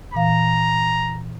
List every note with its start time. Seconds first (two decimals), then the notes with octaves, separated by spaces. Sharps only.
0.14 A#2 E3 F5 A#5